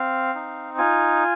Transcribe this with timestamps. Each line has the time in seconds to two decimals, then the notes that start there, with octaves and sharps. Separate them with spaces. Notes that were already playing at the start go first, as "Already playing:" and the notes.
Already playing: C4 F5
0.35 D#4
0.78 F4 G#5